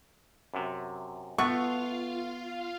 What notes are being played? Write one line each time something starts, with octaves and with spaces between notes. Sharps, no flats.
F#2 C3
A3 B3 F4 F5 C#6